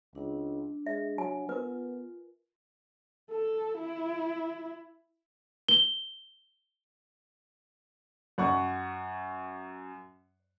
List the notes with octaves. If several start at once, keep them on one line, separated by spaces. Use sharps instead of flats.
C#2 D4
G#3 E5
F#3 G#5
B3 F4 A#4 B4
A4
E4
G7
F#2 F#5 C#6